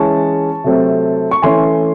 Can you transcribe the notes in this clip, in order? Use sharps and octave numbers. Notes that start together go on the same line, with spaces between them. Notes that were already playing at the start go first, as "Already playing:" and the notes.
Already playing: E3 G#3 C#4 A5 C#6
C3 F#3 A3 C4
C#6
E3 A3 C#4 G#5 C6